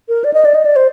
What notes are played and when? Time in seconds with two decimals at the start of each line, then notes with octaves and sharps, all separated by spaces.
0.08 A#4
0.24 D5
0.33 D#5
0.45 D5
0.54 D#5
0.65 D5
0.76 C5